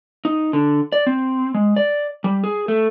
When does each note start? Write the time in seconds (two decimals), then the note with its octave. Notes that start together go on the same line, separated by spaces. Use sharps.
0.25 D#4
0.53 D3
0.92 D5
1.07 C4
1.54 G#3
1.77 D5
2.24 G3
2.44 G#4
2.68 A3